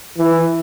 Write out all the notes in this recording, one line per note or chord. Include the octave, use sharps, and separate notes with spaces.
E3